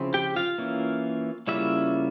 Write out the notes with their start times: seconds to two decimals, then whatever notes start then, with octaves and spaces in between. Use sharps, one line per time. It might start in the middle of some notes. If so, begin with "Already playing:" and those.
Already playing: C#3 F3 C4 E4
0.14 G4 G5
0.36 F4 F5
0.58 E3 A#3 C#4 E4
1.47 C#3 G3 A#3 C#4 E4 F4 E5